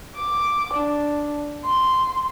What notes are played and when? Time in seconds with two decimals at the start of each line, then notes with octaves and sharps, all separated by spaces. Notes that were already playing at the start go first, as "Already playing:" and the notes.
0.16 D6
0.74 D4
1.64 C6